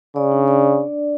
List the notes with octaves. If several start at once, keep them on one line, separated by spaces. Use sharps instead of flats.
C#3 D5
D4
D5